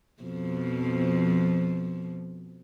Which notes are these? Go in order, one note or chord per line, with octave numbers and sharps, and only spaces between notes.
F2 B2 F3